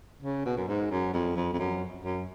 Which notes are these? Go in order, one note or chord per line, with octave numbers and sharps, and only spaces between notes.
C#3
B2
F#2
G#2
F#2
F2
F2
F2
F#2
F#2